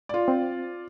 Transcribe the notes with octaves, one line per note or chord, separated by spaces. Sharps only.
F4 D5
C4